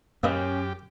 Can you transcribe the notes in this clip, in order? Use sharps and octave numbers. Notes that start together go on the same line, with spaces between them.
F#2 A#3 C#4 G4 B4 D#5